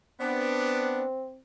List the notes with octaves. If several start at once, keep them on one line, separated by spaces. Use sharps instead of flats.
B3 C4 D4